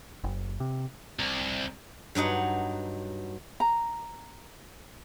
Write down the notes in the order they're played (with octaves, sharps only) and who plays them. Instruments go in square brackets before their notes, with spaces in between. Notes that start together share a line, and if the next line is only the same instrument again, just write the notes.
[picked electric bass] F#1
C3
[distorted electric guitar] C2
[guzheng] G2 F#3 D#4 F#5
[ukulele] A#5